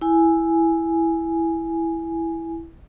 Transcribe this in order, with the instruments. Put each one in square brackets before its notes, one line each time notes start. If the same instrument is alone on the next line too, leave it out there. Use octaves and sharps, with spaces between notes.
[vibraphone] E4 G#5